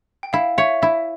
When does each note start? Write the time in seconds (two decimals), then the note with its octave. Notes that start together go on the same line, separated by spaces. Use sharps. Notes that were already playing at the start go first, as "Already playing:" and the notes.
0.23 G5
0.33 E4 F5
0.58 C#5 E5
0.82 E4 E5